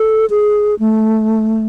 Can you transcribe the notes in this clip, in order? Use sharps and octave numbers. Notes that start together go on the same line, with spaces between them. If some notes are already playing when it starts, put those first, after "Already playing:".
Already playing: A4
G#4
A3